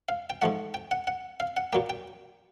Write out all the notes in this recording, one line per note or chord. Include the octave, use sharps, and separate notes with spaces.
F5
G5
G#2 F3 A3 F#5
G5
F#5
F#5
F5
F#5
A#2 F#3 A#3 G5
G5